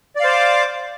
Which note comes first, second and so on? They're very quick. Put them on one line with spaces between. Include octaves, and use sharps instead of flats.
D5 F5 C5 D6